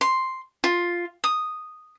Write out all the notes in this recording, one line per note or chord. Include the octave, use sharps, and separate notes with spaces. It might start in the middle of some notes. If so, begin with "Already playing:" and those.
C6
F4
D#6